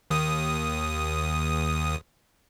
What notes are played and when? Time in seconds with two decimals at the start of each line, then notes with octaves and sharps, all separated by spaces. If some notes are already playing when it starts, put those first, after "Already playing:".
0.10 D#2 D#6